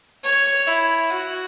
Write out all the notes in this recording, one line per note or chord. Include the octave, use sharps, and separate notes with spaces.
C#5
E4
F#4